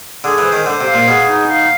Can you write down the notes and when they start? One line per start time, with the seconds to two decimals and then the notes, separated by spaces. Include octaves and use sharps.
0.24 D3 G#4
0.38 E3
0.45 C5
0.52 D#3
0.66 D3 C5
0.81 C3
0.87 F5
0.94 A#2
1.08 B2 G#4
1.29 D#4
1.50 F5